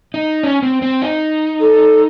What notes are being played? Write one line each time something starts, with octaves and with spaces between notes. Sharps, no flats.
D#4
C#4
C4
C4
D#4
A4